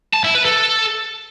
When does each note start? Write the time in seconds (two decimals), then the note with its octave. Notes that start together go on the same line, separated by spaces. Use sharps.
0.14 A5
0.24 E4
0.35 B4
0.45 A4